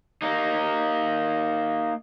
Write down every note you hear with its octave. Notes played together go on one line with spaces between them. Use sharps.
A#3 D#4